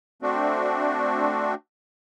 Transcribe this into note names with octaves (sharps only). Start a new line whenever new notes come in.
A3 C4 D4 F#4